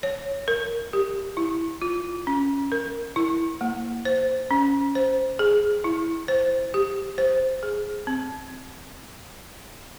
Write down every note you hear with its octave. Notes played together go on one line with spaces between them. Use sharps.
C#5
A#4
G4
E4
F4
C#4
A#4
E4
A#3
C5
C#4
C5
G#4
E4
C5
G4
C5
G#4
C4